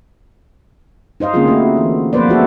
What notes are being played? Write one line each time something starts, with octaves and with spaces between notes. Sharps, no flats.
D#4 C5 D#5 F5
D3 A#3 C4 C#4 F4 G#4
A3 D#4 E4 F#4
E3
F3 A#3 B3 B4 C5 D5
G#3 A#3 C4 E4 F#4 A4